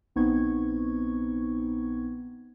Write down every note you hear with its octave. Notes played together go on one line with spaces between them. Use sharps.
A#1 B3 C4 D#4 C#6 G#6